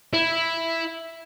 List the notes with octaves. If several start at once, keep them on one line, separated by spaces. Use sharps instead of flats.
E4